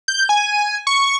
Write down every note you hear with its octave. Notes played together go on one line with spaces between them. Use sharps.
G6
G#5
C#6